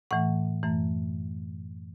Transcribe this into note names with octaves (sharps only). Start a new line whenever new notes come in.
A2 E3 A3 F#5
F#2 E3 A3